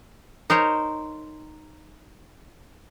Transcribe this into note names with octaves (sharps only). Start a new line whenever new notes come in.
D#4 A#4 C5 C#5